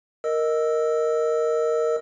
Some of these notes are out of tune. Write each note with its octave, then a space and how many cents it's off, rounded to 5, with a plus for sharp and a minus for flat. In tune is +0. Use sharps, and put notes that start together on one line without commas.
A#4 +0 D#5 +0 E6 +0